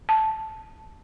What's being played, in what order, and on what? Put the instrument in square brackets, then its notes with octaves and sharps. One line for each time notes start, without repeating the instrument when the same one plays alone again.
[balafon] A5